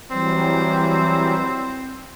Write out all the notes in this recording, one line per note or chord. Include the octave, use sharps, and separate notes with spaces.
E3 F#3 G3 C4